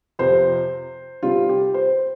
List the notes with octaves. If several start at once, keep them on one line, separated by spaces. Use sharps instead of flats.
F2 C3 F3 C5
C3 G3 C4 F4
G4
C5